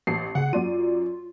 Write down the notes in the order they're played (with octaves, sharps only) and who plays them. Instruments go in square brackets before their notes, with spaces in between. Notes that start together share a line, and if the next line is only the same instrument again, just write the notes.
[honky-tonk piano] A1 A5 C7
[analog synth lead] C#3 [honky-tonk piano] G#4 F#5
[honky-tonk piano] F#2 D5 D#7 [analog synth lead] F4